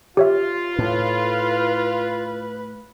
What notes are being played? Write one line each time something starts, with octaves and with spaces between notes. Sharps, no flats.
F4 G4 C#5 E5
A2 B4